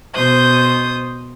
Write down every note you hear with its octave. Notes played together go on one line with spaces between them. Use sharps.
B2 C5 D#6 G6